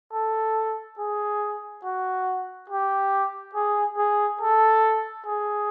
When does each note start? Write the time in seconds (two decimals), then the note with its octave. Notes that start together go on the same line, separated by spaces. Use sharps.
0.13 A4
0.99 G#4
1.84 F#4
2.70 G4
3.55 G#4
3.98 G#4
4.41 A4
5.26 G#4